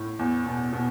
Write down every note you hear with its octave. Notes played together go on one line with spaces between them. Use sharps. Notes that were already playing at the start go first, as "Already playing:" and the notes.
Already playing: A2
E2
B2
B2